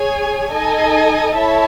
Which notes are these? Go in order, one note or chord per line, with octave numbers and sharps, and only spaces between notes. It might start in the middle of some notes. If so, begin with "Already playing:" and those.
Already playing: G#4 C#5 G#5
D#4 A4 D#5 G#5
E4 A4 C#5 E5 A5